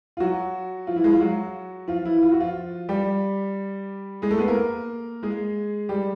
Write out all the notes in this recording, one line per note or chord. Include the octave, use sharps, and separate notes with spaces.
F4
F#3 F#4
F3 F4
E3 E4
G#3 G#4
F3 F4
F#3 F#4
F3 F4
E3 E4
F4
F#4
F3 F4
G3 G4
G#3 G#4
A3 A4
B3 B4
A#3 A#4
G#3 G#4
G3 G4